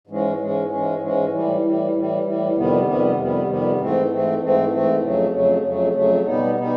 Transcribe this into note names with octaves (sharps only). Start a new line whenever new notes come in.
G#2 E3 G#3 C#4
G#2 E3 G#3 C#4
G#2 E3 G#3 C#4
G#2 E3 G#3 C#4
A2 E3 G3
A2 E3 G3
A2 E3 G3
A2 E3 G3
F2 C3 D#3 G3 B3
F2 C3 D#3 G3 B3
F2 C3 D#3 G3 B3
F2 C3 D#3 G3 B3
G#2 E3 A3 C4
G#2 E3 A3 C4
G#2 E3 A3 C4
G#2 E3 A3 C4
F2 C#3 F#3 A3
F2 C#3 F#3 A3
F2 C#3 F#3 A3
F2 C#3 F#3 A3
B2 G3 B3 D#4
B2 G3 B3 D#4